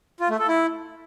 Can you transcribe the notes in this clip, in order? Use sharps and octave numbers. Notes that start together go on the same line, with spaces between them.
F4
A3
A4
E4